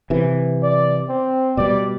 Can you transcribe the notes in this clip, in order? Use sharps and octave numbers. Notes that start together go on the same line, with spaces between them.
C3 E3
D5
C4
B2 G3 D5